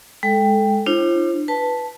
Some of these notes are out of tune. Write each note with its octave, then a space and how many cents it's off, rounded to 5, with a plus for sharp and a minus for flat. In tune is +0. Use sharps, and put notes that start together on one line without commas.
G#3 +0 A4 -10 G5 +5
D4 +25 F4 -40 C5 +35
B4 +0 A5 +0